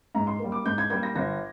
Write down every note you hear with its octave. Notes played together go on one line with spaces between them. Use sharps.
G#2 A#5
C6
G3 A#3
D6
G#2 G6
G#6
G3 A#3 G#6
A#6
G1 A#6